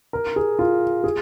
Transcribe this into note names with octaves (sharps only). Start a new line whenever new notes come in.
A#4
G#4
F4
G#4